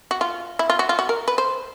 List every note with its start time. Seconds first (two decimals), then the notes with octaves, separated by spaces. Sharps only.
0.11 F#4
0.21 F4
0.59 E4
0.70 F4
0.79 F#4
0.89 F4
0.99 F#4
1.09 A#4
1.28 B4
1.38 C5